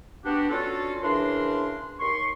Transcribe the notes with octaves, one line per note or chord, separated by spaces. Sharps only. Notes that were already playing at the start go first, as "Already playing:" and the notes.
B3 D4 F#4 G4
C#4 D4 F4 F#4 A4
C#3 E3 D4 A#4 C6
D#2 C6 C#6